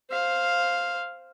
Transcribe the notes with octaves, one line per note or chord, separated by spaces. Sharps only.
C5 F5